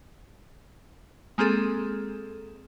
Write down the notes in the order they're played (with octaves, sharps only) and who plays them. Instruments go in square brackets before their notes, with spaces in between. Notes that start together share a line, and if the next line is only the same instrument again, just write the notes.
[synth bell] G#3 A#3 C4 G#4 A4